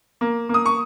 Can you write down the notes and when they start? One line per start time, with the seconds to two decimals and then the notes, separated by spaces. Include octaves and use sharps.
0.21 A#3
0.49 A#3
0.54 D#6
0.65 C#6